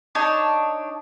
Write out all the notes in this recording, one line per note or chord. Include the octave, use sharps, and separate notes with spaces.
D4 D#4 C#5 A5